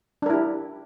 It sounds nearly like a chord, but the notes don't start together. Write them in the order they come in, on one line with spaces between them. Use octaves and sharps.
D4 A#4 E4 G4